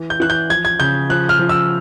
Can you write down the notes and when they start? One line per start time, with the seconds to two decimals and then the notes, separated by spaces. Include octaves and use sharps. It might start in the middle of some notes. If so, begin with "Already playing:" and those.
Already playing: E3
0.10 G6
0.20 E3 F#6
0.30 G6
0.50 F3 G#6
0.65 G#6
0.80 C#3 G6
1.09 F3 F#6
1.29 F6
1.39 F3
1.49 E6